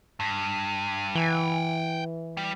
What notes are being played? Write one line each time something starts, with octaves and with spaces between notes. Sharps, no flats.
G2
E3 G5 G#5
G3